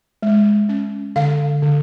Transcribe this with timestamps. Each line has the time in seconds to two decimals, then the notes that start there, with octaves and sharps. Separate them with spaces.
0.23 G#3
0.69 C#4
1.16 D3 F5
1.62 D3